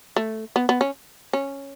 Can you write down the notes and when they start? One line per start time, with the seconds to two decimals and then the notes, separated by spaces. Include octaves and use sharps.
0.16 A3
0.56 B3
0.69 B3
0.81 C#4
1.33 C#4